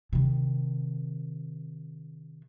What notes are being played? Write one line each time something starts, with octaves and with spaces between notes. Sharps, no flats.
C3 D#3